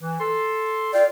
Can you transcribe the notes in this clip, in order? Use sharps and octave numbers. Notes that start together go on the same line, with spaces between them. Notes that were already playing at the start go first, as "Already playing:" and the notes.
E3
A4 C6
F4 D5 F5 G5